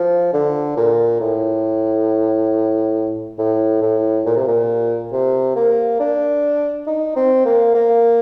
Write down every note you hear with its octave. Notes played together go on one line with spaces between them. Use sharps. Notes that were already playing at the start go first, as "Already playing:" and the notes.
Already playing: F3
D3
A#2
A2
A2
A2
A#2
C3
A#2
C3
A#3
D4
D#4
C4
A#3
A#3